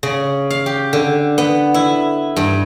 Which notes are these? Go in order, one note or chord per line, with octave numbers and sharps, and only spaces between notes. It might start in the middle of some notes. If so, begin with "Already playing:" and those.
C#3
F5
G4
D3
B3
E4
G2